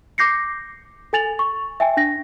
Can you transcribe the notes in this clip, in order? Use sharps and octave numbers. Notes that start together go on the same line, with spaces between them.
D6 G6 A#6 C7 C#7
A4 G#5 A6 F7 F#7
C#6
E5 G5 G#5
D4 A#6